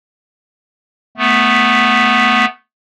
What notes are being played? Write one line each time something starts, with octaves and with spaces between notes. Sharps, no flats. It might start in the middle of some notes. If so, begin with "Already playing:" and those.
A3 B3